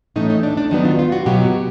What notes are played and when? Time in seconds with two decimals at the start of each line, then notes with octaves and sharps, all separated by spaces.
0.16 A2 E3 A3 C#4 D#4
0.30 D#4
0.43 D4
0.57 D4
0.71 D#3 F#3 B3 D#4
0.85 F4
0.99 F4
1.12 F#4
1.26 B2 F#3 B3 G4